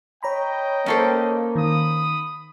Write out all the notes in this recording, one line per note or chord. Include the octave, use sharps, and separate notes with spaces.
C#5 D#5 G5 A#5 B5
A#3 C#4 A4 C5
D#3 B5 D#6